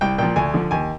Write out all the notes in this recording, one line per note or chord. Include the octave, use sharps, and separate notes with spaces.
C2 G5
A#2 F3 G5
D2 G#5
D3 F3
D#2 G#5